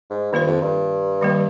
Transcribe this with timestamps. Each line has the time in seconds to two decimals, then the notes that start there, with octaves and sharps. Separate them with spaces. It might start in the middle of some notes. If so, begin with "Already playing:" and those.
0.10 G#2
0.32 G2 D#3 A#3 F4 C5
0.47 F2
0.62 G2
1.21 D#3 G3 A#3